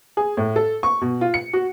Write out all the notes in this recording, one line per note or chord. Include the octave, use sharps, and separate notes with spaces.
G#4
A2
A4
C#6
B2
F4
C#7
F#4